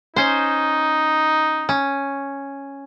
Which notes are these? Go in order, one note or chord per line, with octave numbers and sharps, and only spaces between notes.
C#4 D#4 C5
C#4